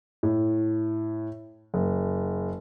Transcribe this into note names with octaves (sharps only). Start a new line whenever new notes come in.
A2
F#1